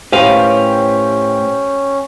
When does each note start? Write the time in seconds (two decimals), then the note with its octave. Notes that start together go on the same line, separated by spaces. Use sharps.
0.12 A2 C#4 G4 B4 C5 F5